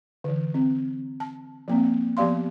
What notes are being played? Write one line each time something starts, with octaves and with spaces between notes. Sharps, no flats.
D3 E3
C4
A5
F3 A#3 C4
F3 B3 G4 D5 F5 C6